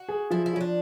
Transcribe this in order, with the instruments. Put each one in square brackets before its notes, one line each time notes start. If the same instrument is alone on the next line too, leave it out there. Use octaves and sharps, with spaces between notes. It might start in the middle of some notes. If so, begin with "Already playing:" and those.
Already playing: [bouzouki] F#4
[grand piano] G#4
[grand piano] F3 [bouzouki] E4
[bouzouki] E4
[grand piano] F3 [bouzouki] C#4
[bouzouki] D4